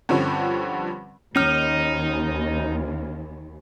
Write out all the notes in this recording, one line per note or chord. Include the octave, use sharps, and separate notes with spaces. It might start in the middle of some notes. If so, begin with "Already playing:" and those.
G2 D3 F3 G3 C4 C#4
D#2 C#4 D#4 F6